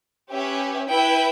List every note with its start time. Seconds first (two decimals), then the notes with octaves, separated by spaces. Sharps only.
0.31 C#4 G4 B4 E5
0.89 E4 B4 E5 G5